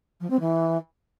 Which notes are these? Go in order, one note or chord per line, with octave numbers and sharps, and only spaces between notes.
F3
C4
E3